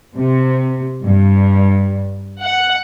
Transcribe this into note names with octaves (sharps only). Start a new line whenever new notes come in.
C3
G2
F#5